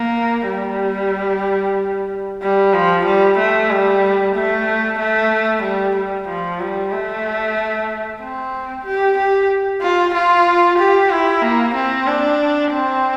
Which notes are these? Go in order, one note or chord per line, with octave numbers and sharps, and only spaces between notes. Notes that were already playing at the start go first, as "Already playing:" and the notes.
Already playing: A#3
G3
G3
F3
G3
A3
G3
A3
A3
G3
G3
F3
G3
A3
C4
G4
G4
F4
F4
G4
E4
A#3
C4
D4
C4